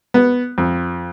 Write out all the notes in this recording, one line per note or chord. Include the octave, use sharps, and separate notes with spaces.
B3
F2